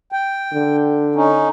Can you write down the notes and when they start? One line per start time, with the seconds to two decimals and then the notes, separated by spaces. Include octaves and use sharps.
0.12 G5
0.53 D3
1.15 C#4 D#4